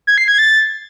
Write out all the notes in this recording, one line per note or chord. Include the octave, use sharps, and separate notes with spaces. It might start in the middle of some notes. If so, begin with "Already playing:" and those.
G#6
C7
G#6
A6